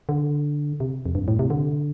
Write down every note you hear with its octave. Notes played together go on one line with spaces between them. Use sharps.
D3
C3
F2
G2
A2
C3
D3